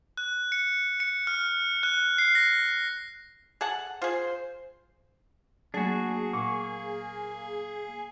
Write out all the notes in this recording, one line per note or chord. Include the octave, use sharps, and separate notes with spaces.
F#6
C#7
C#7
F6
F#6
C7
A#6
G#4 A4 F#5
F4 G#4 C5
F#3 A3 A#3 D4 F#4 G#4
A#2 A#3 C#6